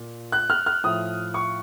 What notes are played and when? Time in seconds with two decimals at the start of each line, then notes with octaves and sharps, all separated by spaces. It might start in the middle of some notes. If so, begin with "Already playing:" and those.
Already playing: A#2
0.32 F#6
0.50 F6
0.66 F6
0.83 A2 F3 D#6
1.34 C#6